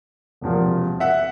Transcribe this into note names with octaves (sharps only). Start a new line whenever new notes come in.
E1 E2 C3 F3 A#3
E5 F#5